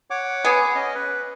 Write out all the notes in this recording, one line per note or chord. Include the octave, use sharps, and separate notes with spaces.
C#5 F#5 D6
B3 G#4
C#4 D#5
B4